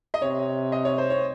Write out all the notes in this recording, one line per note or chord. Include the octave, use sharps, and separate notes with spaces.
D#5
C3 C#5
D#5
C#5
C5
C#5